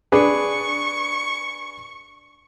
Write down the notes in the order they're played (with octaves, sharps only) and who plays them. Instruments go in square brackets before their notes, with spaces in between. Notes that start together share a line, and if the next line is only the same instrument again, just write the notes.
[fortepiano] D4 G#4 B4 [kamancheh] C#6